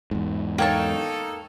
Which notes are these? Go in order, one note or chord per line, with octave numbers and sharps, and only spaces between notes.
E2 G#2
A#3 D#4 A4 C#5 G5 A5